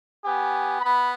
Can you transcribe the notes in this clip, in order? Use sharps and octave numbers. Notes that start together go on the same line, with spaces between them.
B3 G4 G#5
B3 B5